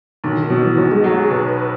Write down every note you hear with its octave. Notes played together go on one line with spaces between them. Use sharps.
B1 D#3
D#3
B2 F#3
E3
B1 F#3
G#3
F#3 F#4
G#4
B1 B4
B4